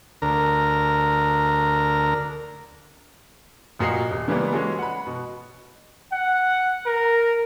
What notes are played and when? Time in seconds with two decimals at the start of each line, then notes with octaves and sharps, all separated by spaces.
0.22 D2 A#4
3.79 F1 A#2 F#4 D#5 A#5 C7
4.11 D#1
4.28 C#3 E3 G3 G#3 A#3 B3
4.53 E3 G#3 C#4 F#4 G#4 A4
4.79 F#5 B5
5.07 B2
6.12 F#5
6.86 A#4